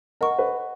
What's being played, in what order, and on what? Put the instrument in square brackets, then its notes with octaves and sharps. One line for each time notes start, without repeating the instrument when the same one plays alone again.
[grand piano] A#4 [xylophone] D#5 F#5 C#6
[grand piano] B4